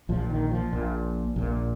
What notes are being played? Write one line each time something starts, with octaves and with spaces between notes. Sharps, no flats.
A#1 A#2 F3
D#3
F3
A#1 A#2
A#1 A#2